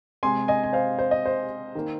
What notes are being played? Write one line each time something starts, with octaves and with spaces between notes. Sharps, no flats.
C3 G#3 G#5 C6
D#5 G#5
G#5
C5 F5
C5
D#5
C5
D#3 A#3